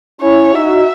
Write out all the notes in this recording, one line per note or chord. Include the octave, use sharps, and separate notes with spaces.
C#4 E4 C#5
D#4 F#4 E5